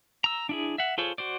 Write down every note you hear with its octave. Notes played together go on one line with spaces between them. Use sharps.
A#5 E6
D4 E4 G#4
E5 F#5
F4 G#4 A4 C5 C#5
F#4 C5 D5